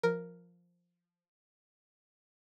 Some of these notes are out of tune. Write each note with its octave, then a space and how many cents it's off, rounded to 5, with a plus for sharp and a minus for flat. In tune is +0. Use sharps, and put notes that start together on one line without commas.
F3 +0 A#4 +0